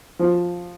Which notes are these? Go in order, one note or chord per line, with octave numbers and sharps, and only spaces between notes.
F3